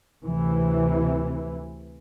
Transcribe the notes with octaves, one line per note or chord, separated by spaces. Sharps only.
D2 C3 E3